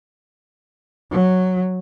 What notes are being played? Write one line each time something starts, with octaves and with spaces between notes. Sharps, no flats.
F#3